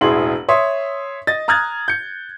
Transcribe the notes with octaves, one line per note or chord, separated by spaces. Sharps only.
E1 A1 E4 G#4 C6 F#7
C#5 E5 C6 D#6
D#5 A6
A#5 D#6 F6 F#6 G#6 A6
G6 C#7